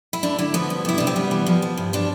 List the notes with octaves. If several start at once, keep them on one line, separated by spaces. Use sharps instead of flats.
E4
D3 D4
D3 E4
F3 B3
G2
C3 E4
C3 D4
C4
G3 B3
E3
F3
F3
G2
F3 D4